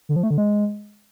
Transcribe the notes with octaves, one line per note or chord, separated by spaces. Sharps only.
D3
F3
A3
D3
G#3